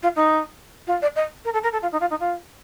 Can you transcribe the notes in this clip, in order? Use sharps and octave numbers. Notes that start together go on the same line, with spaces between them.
F4
D#4
F4
D5
D#5
A#4
A4
A#4
A4
F4
D#4
F4
D#4
F4